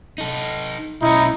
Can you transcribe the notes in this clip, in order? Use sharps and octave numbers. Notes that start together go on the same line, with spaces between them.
D#4 A4
B1 C#4 D#4 E4